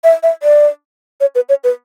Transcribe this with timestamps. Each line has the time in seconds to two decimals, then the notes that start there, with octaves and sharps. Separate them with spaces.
0.04 E5
0.23 E5
0.43 D5
1.21 C#5
1.35 B4
1.49 C#5
1.64 B4